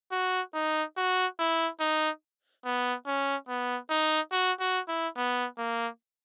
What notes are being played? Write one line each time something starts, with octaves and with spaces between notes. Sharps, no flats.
F#4
D#4
F#4
E4
D#4
B3
C#4
B3
D#4
F#4
F#4
E4
B3
A#3